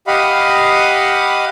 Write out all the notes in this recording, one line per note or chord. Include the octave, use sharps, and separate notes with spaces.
G4 D#5 F5 F#5 B5